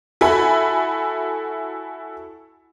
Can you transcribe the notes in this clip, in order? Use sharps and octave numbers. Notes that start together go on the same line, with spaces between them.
E4 F#4 A4 G#5 B5